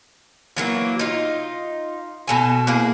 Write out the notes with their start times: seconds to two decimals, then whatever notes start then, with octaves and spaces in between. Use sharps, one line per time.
0.57 E3 F#3 A#3
0.99 D#4 F4
2.27 B2 A4 G#5
2.67 A#3 E4 G#4